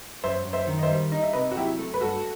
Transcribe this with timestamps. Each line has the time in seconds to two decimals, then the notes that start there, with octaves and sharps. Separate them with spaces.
0.24 F#2 C5 E5
0.45 F#2
0.53 C5 E5
0.67 D#3
0.79 D#5
0.83 C5 E5
0.91 G3
1.12 D#4 D#5
1.23 E5
1.33 C3 B4 D#5
1.51 F#4
1.57 F#3 E4 G4
1.79 A3
1.94 B4
2.01 G2 F#4 A4